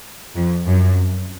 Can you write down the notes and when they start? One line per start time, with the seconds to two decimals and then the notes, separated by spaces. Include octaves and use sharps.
0.36 F2
0.68 F#2